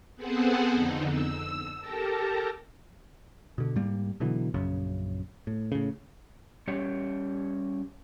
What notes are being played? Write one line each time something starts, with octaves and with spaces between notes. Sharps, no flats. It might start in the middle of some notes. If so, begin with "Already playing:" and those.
B3 C4 G#4 A4 C5 F#5
F2 D3 D#4
E6
G4 A4 A#4 A5 A#5
B2 D3
G#2 G3 A#3
B2 D3 E3 F#3
A#1 F#2 C#3
A2
A2 C#3
G3 C#4 G4 C#5